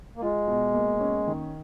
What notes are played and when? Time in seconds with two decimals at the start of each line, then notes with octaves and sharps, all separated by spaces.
0.16 A#3
0.22 G#3 F4
0.48 B2
0.74 A#3
1.00 C#4
1.27 D#3